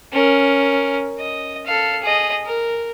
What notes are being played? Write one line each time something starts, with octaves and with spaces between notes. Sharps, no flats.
C#4 A#4
D#5
A4 F5
G#4 D#5
A#4